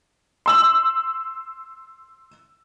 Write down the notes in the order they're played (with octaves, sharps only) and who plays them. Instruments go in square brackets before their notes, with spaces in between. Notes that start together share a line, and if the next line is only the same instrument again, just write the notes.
[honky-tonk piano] C6 E6 F#7